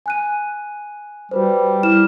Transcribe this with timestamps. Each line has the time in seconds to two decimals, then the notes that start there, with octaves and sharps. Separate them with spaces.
0.06 G#5 F#6 D#7
1.31 G3 F#4 B4 C5
1.83 E4 F6 E7